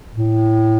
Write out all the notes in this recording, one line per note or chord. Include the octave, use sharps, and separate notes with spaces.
A2